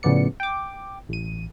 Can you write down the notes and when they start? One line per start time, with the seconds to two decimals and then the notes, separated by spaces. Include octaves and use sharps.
0.03 A2 C#3 F3 B3 D5 C#7
0.40 G5 D6
1.09 A1 D#7